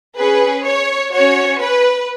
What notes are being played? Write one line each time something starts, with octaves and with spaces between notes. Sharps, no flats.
C#4 G#4 B4
C#5
C#4 F#4 C#5
B4